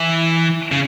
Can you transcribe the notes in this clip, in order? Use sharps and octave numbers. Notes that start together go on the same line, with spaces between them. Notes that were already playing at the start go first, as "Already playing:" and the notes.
Already playing: E3
C#3